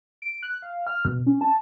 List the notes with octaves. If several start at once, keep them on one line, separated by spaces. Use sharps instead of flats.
D7
F#6
F5
F6
B2
C#4
A5